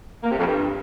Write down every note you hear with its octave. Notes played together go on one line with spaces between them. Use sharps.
A#3
C3
F2
G2